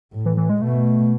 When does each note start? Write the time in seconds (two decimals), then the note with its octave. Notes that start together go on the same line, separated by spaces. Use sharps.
0.13 A2
0.25 E3
0.37 E3
0.49 G#3
0.62 B2 A3